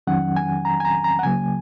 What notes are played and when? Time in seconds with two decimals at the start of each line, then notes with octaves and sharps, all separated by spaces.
0.07 F2 D#3 F#3 C#4 F#5
0.37 G#5
0.65 A#5
0.80 G#5
0.85 A#5
1.04 A#5
1.19 F#5
1.23 C#2 C#3 F#3 A#3 G#5